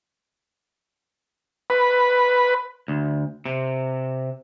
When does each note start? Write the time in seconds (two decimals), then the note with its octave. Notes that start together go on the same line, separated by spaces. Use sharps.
1.70 B4
2.88 D2
3.45 C3